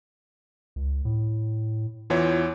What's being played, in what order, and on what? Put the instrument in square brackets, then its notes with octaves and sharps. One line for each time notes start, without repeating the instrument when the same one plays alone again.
[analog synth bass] C#2
A2
[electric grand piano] E2 E3 C#5 [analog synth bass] F4